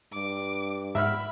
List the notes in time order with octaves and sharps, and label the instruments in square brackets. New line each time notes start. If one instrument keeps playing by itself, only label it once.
[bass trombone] G2 [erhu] D6
[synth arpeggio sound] G#2 F#5 [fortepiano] E5 E6 F6 [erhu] B5